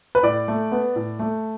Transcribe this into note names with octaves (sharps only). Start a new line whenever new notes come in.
B4
A2 D5
A3
B3
A2
A3